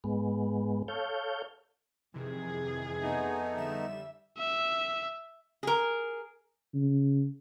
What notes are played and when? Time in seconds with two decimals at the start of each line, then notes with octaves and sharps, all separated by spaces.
0.04 G#2 G#3 B3
0.88 A4 C#5 F5 G6
2.14 F2 C3 D#3 E3 G#4
3.02 A3 B3 D#4 G#5
3.57 D3 G3 E5 E7
4.38 E5
5.63 G#4 A#4
6.74 C#3